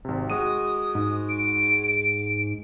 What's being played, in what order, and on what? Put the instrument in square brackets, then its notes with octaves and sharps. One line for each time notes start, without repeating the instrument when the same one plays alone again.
[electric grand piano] G#1 C3
[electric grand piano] G#3 F#4 D#7 [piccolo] D#6
[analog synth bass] G#2
[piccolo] D7